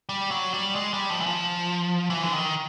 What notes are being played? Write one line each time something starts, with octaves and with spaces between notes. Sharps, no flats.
G3
F#3
G3
G#3
G3
F3
E3
F3
E3
D3
D#3